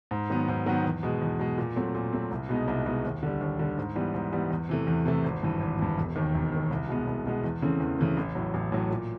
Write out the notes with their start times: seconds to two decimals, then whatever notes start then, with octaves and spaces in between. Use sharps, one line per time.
0.11 G#2
0.30 D#3 F#3 B3
0.48 G#2
0.66 D#3 F#3 B3
0.84 E2
1.03 B2 G#3
1.22 E2
1.39 B2 G#3
1.58 A#2
1.76 F#3 A3 C4
1.95 A#2
2.13 F#3 A3 C4
2.31 C2
2.49 B2 G#3 B3 D#4
2.68 C2
2.86 B2 G#3 B3 D#4
3.04 D#2
3.23 D3 G3
3.41 D#2
3.59 D3 G3
3.78 G#2
3.96 E3 G3 B3
4.14 G#2
4.32 E3 G3 B3
4.51 E2
4.69 C3 E3 A3
4.87 E2
5.06 C3 E3 A3
5.24 G#1
5.43 G2 E3
5.61 G#1
5.79 G2 E3
5.97 E1
6.16 D#2 D#3
6.34 E1
6.52 D#2 D#3
6.71 C2
6.89 B2 G#3 B3
7.07 C2
7.26 B2 G#3 B3
7.44 E2
7.62 C#3 E3 A3 C4
7.80 E2
7.98 C#3 E3 A3 C4
8.17 A1
8.35 A2 F#3
8.54 A1
8.72 A2 F#3
8.90 A#2